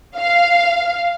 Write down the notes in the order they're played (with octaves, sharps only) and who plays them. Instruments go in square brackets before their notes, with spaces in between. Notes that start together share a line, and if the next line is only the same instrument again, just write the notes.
[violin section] F5